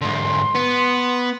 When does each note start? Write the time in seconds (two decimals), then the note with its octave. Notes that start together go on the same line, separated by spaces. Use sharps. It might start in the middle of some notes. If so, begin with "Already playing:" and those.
0.01 G#2 D3 C6
0.55 B3